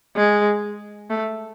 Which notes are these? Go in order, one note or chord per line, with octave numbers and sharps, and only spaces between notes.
G#3
A3